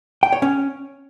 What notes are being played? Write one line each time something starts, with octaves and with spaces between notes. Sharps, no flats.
G5
C#5
C#4